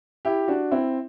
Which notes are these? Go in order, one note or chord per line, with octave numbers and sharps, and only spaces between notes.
E4 G4
D4 F#4
C4 E4